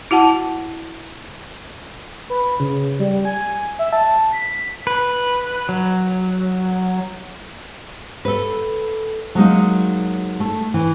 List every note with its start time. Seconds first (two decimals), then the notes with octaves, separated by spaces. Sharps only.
0.11 E4 F#4 F#5 A5
2.30 B4
2.60 C#3
2.99 G3
3.25 G#5
3.79 E5
3.93 A5
4.32 B6
4.87 B4
5.69 F#3
8.25 A4 B4
9.35 F#3 G#3 A#3 D#4
10.40 A3
10.74 E3